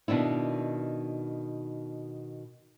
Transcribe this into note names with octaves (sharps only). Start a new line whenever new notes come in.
B2 D#3 D4 E4